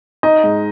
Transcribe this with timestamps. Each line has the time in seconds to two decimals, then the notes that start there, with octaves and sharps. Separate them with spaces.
0.23 D#4 D#5
0.43 G#2